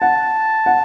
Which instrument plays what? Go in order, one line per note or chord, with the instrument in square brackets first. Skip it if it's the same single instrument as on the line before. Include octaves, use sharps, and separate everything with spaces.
[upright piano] F#5 [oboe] A5
[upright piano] F#5